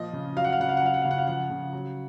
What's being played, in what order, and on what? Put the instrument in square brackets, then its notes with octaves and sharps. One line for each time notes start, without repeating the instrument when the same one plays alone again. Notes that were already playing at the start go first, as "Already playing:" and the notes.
Already playing: [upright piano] A#2 F3 D#5
C#3
F#3 F5
F#5
F5
C#3 F#5
F5
F#5
F#3 F5
F#5
C#3 F5
F#5
F5
F3 F#5
C#3
F#3